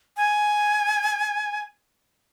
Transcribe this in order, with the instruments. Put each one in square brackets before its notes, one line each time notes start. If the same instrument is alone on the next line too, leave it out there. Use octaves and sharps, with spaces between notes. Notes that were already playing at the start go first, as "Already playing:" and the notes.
[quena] G#5